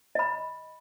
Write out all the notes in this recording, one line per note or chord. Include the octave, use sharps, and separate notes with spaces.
D#5 B5